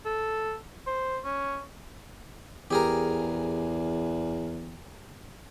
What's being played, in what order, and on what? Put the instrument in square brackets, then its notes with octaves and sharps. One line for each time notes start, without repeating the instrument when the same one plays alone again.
[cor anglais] A4
C5
C#4
[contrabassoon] E2 [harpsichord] G4 G#4 A#4